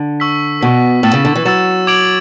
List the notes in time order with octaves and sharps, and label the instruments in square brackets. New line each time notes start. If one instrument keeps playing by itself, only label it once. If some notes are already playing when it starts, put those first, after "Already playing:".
Already playing: [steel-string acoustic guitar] D3
[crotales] C#6 E6 B6
[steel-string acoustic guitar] B2 [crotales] C#6 E6 B6
[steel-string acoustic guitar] A2 [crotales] E6 A6 E7
[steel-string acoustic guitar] C#3
D3
E3
[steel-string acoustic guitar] F#3 [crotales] E6 A6 E7
[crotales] D6 G#6 D7 F#7